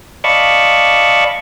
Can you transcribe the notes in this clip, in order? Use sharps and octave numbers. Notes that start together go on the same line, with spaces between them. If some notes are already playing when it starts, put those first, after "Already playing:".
D5 D#5 F5 A5 B5 C#6